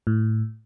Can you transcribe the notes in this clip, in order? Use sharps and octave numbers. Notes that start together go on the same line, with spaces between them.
A2